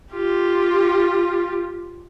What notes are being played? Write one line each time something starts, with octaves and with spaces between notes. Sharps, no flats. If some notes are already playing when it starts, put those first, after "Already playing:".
F4 G4